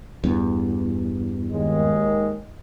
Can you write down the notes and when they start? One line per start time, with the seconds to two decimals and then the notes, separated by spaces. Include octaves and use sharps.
0.24 E2 G2
1.50 D#2 D#3 G#3